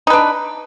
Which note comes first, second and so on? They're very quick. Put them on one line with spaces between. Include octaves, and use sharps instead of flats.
D#4 B4 D4